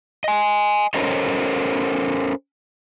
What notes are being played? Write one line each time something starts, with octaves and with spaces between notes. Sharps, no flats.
D#5 G#5
C#4 A4 A#4 C5 C#5 D#5